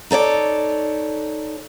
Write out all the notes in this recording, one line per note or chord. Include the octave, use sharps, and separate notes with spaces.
D#4 A4 C#5 D5